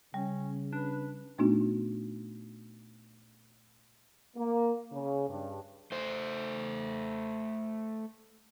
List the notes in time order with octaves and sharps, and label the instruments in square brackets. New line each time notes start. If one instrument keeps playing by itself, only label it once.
[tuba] C#3 [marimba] G3 [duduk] C#4
[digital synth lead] D4 [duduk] B4
[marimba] A#2 A3 B3 D4 D#4 F#4
[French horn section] A#3
C#3
G2
[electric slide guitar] A3 C5